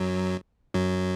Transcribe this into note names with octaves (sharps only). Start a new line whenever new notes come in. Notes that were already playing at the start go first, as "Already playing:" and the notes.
Already playing: F#2 F#3
F#2 F#3